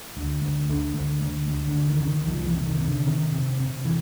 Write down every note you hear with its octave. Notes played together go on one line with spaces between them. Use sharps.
D2
D2
D2 D3
D2
D2
D2
D3
D2
D#3
C#3
D#3
C2 F3
F3
E3
C3
D#3
C3
D3
C3 D#3
C3
C3
E3